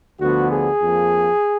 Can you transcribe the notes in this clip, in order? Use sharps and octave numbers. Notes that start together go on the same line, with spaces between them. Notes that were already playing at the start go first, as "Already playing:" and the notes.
D2 D3 F3 B3 F#4
G#4
F2 F3 A#3